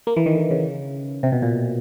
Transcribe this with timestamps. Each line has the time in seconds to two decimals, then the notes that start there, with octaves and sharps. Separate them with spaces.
0.07 A#3
0.16 E3
0.26 D#3
0.35 D3
0.51 C#3
1.23 C3
1.32 B2
1.42 A#2